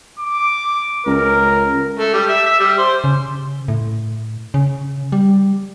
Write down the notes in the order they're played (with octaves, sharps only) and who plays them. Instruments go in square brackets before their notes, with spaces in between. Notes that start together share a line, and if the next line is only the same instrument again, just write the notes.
[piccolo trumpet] D6
[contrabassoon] C#2 [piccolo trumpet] A#4
[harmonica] A3
G3
E5
E5
G3
C5
[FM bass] C#3
A2
C#3
G3